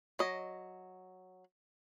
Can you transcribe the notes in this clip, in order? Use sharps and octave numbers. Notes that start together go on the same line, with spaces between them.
F#3 D#5